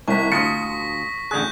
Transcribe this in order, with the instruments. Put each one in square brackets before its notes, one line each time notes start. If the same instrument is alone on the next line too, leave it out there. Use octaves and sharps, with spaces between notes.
[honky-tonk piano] C2 [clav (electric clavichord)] D#3 [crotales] C#6 B6
[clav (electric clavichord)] D2 F4 A5 [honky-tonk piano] D#6 C#7 [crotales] A#6 B6
[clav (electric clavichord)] A1 D3 G#4 [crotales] F#6 G6